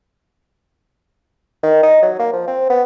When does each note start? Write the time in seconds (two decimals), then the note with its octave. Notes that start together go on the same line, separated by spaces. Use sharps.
1.63 D#3
1.83 D#4
2.02 F#3
2.19 A#3
2.33 F3
2.47 C4
2.70 B3